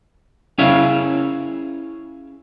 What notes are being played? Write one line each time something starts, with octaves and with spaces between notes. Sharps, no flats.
C#4 E4 G#4 C#5 E5 F5